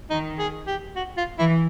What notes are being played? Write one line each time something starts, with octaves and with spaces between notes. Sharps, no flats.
D#3 D#4
G#4
G4
F#4
F4
E3 E4